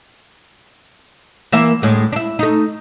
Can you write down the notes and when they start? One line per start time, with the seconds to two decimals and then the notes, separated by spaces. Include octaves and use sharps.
1.52 E3 A#3 E5
1.82 D2 A2 G#3
2.12 D4 E4
2.39 A3 D#4